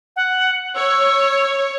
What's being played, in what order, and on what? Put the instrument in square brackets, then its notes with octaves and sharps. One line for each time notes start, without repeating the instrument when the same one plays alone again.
[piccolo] F#5
[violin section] C#5 [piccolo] E6